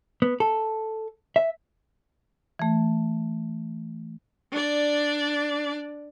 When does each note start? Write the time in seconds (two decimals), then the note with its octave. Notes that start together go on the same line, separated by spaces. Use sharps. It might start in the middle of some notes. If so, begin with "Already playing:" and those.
0.22 B3
0.40 A4
1.36 E5
2.59 E3 A3
4.52 D4 D5